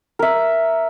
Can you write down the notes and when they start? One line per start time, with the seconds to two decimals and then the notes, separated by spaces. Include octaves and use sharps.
0.19 A#4 E5